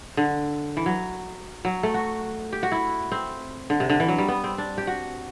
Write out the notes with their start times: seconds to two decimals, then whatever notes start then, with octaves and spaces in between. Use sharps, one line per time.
0.17 D3
0.77 E3
0.86 F#3
1.65 F#3
1.83 A3
1.94 F#4
2.53 G4
2.63 F#4
2.72 E4
3.12 C4
3.70 D3
3.80 C3
3.90 D3
4.00 E3
4.08 F#3
4.18 G3
4.28 B3
4.44 C4
4.58 D4
4.78 G4
4.87 F#4